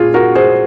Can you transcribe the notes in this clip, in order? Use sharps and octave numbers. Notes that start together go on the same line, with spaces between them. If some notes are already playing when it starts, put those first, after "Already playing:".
Already playing: A#2 F4 G#4
F#4 A#4
G#4 C5